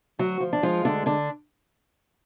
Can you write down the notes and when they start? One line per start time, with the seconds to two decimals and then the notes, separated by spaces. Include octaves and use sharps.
0.19 D2 F#3 F#4
0.40 F3
0.53 D4
0.63 F3 G#3 F4
0.85 D2 D3 D4
1.06 D3 D4